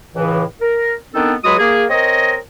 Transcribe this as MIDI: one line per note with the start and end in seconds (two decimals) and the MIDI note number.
0.16 0.43 37
0.16 0.43 45
0.16 0.43 49
0.16 0.43 52
0.61 0.94 70
1.14 1.34 51
1.14 1.34 59
1.14 1.34 60
1.14 1.34 62
1.14 1.34 63
1.14 1.34 69
1.44 1.55 37
1.44 1.55 54
1.44 1.55 56
1.44 1.55 66
1.44 1.55 83
1.44 1.55 87
1.59 1.85 58
1.59 1.85 68
1.90 2.36 60
1.90 2.36 70
1.90 2.36 73
1.90 2.36 75